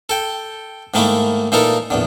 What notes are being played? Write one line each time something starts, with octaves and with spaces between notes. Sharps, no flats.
A4 G5
G#2 D#3 A3 A#3 E4
A#2 E3 D#4 E4 A4 A#4
A#1 E2 D3